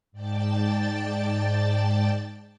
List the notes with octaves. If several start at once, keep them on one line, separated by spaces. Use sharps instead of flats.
G#2 D5 G5 A5 A6